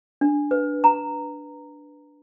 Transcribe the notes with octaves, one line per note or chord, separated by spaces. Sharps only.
D4
B4
A#5